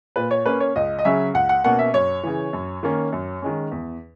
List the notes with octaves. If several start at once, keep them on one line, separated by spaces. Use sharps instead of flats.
A#2 B4
C#5
A#3 C#4 B4
C#5
C#2 D#5
D#5
C#3 F#3 C#4 E5
C#2 F#5
F#5
B2 A#3 C#4 F#5
E5
F#2 C#5
C#3 E3
F#2
D#3 A#3 C#4
F#2
D#3 G#3 C#4
E2